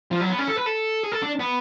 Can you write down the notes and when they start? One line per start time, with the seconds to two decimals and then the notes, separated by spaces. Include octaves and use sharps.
0.11 F3
0.21 F#3
0.30 B3
0.39 C#4
0.48 A4
0.58 B4
0.66 A4
1.04 G#4
1.12 A4
1.22 D4
1.39 B3